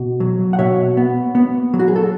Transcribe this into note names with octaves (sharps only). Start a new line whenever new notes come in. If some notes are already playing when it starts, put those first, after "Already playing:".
Already playing: B2
F#3
F#5
B2 C#5 E5
B3
B3
F#3
F#4
G#4
A4